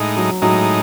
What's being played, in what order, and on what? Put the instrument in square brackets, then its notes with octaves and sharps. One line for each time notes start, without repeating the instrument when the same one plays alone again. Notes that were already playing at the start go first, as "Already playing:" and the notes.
Already playing: [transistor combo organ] A2 G#3 D#4
[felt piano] F#3
[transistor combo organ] A2 G#3 D#4 [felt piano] F#3